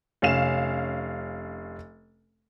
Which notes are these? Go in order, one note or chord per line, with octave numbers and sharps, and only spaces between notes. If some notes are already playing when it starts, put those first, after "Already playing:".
F1 C#4 F5 E7